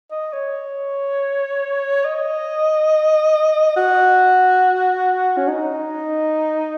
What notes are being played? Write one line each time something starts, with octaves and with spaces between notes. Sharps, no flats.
D#5
C#5
D#5
F#4
C#4
D#4